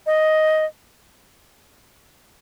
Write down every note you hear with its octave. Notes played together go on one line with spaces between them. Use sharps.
D#5